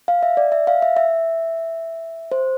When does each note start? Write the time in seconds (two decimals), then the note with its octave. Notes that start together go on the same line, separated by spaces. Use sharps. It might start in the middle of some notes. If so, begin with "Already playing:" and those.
0.08 F5
0.23 E5
0.37 D5
0.52 E5
0.67 F5
0.82 E5
0.97 E5
2.32 C5